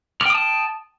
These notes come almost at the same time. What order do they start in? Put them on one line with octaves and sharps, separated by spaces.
F6 G5 D#6 A5